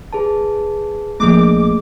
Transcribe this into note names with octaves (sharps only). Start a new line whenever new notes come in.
G#4 B4 A5
A#1 A3 A#3 G#4 D6